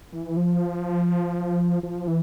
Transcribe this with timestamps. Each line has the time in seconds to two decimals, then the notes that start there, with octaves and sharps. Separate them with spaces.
0.13 E3
0.37 F3
1.83 F3
2.08 E3